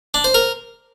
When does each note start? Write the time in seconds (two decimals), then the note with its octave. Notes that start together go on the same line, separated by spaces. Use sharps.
0.14 D4
0.24 C5
0.34 A#4